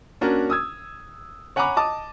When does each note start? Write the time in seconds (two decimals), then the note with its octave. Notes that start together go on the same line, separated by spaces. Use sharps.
0.21 A#3 C#4 D4 F#4 A#4
0.50 D#6 E6 G#6
1.56 C#5 F#5 G#5 A#5 B5 D6
1.77 D#5 A5 D6 D#6